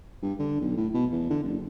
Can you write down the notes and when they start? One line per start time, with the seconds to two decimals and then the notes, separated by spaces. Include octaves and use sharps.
0.22 G2
0.39 D3
0.61 B1
0.77 A2
0.94 B2
1.11 E2
1.30 D3
1.44 F#1